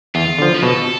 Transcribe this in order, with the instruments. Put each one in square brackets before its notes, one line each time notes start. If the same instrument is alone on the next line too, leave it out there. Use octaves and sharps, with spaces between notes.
[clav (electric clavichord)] E2 [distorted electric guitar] F4
[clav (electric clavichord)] D3 F3
[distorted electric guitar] B4
[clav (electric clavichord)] B2 [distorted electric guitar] A4